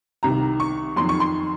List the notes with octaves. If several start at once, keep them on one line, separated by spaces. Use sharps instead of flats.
C2 C3 D#3 A#5
C#6
F2 D#3 F#3 C6
C#6
C6